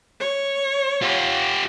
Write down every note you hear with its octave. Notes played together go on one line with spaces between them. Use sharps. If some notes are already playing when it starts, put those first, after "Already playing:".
C#5
F4 G4